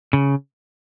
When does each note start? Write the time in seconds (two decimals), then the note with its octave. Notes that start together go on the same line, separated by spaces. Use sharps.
0.13 C#3